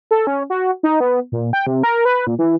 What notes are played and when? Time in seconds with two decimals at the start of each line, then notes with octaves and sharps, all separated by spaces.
0.11 A4
0.27 C#4
0.50 F#4
0.83 D#4
1.00 B3
1.32 A#2
1.53 G5
1.67 C3
1.83 A#4
2.05 B4
2.27 A#2
2.39 E3